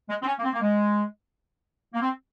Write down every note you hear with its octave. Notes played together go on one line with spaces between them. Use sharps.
G#3
C4
C#4
A#3
C4
A#3
G#3
A#3
C4